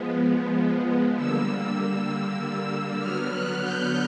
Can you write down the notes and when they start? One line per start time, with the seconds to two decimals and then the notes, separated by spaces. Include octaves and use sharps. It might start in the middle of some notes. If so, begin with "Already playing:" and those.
Already playing: F3 G#3 B3
1.16 D3 G3 A#3 E6
2.99 D3 F#3 B3 F6
3.31 F#6
3.62 G6